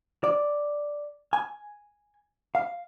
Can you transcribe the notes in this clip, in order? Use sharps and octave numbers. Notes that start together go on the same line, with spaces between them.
D5
G#5
F5